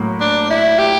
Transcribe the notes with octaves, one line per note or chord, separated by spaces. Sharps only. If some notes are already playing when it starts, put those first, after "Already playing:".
Already playing: A2 F#3 A#3
D4
E4
G4